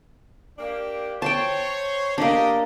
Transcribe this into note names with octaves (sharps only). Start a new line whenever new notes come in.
A#3 D4 G4
C5 C#5 G5 A5
A#3 D4 G4 A#4 D#5